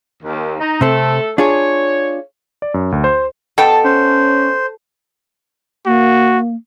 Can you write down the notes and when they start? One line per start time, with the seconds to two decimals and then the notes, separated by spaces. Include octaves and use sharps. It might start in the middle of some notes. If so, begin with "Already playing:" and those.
0.23 D#2
0.60 D#4
0.81 C3 A3 C4 A4
1.38 D4 F4 G#4 C#5
2.62 D5
2.74 F#2
2.92 D2
3.04 C5
3.58 B2 A4 G5 A5
3.85 C#4 C5
5.86 A#3 F#4